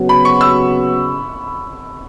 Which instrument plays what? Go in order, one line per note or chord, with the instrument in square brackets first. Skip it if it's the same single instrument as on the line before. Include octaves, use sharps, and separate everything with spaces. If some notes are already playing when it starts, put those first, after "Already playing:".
Already playing: [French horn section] C#3 F#3 B3 F#4
[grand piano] B5
C#6
E6